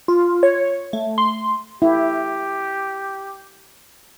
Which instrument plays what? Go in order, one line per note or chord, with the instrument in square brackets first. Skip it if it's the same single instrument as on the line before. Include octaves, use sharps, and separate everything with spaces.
[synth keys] F4
C#5
A3
C6
[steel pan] E4 [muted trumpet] G4